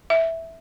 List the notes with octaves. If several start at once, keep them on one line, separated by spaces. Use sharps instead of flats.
E5